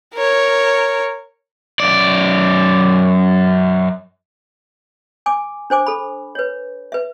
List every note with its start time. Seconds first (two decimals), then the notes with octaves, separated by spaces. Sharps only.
0.15 A#4 C#5
1.80 F#2 D5
5.26 G#5 D6
5.70 D4 C5 G#5 D6
5.86 A4 B5
6.35 B4 C#5
6.92 B4 E5